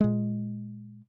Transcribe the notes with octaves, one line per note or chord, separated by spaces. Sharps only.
A#2 G#3